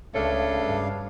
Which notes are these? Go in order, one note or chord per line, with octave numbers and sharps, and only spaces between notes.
C#2 C#3 A3 D4 C#5 F5
G2